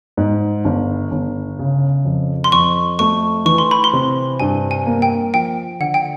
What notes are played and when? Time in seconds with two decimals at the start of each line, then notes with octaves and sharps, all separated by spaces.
0.17 G#2
0.65 G1
1.11 G1
1.59 C#3
2.05 F2
2.44 C6
2.52 F2 C#6
2.99 A3 C#6
3.45 E3 C#6
3.58 C6
3.71 B5
3.84 C6
3.93 C3
4.40 G2 G#5
4.71 G#5
4.86 A#3
5.02 G5
5.34 F3 G5
5.80 D3 F#5
5.94 G5